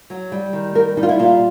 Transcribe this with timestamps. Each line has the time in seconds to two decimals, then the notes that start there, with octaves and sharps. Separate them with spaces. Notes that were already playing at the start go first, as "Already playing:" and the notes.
0.10 F#3
0.32 G3
0.53 D#3
0.75 G3 A#4
0.97 G3 D#4
1.03 F4
1.09 E4
1.19 A#2 F4